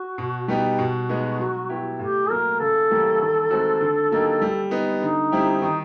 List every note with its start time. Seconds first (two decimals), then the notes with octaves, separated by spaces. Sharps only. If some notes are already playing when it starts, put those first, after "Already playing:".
Already playing: F#4
0.18 B2
0.48 G3 B3 D#4 G4
0.79 B2 F#4
1.09 G#3 B3 D#4
1.39 F#3
1.70 B3 E4 G4
1.99 A2 G4
2.30 F#3 A#3 A#4
2.59 C#3 A4
2.90 E3 G3 A#3 C#4
3.21 D#3
3.51 G#3 C4 D#4 F#4
3.81 D3
4.11 F#3 A#3 D#4 G4
4.42 G3
4.71 B3 D#4
5.01 D3 D#4
5.32 G3 C4 E4 G4
5.62 D#3 D#4